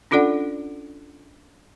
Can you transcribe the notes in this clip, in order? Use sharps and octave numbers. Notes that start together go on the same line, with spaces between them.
C#4 D4 F4 A4 D5 F#5